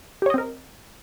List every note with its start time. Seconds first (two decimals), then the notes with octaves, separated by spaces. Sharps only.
0.22 G4
0.26 C#5
0.30 D#5
0.34 C4
0.38 A#4